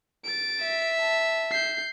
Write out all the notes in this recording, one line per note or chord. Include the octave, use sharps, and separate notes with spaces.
A6 D7
E5
A5
G6 C7